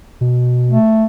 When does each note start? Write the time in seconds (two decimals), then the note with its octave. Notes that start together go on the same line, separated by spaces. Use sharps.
0.21 B2
0.71 A3